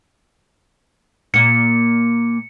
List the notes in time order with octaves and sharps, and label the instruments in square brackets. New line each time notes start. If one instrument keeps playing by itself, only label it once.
[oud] A#2 A#3 [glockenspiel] C#7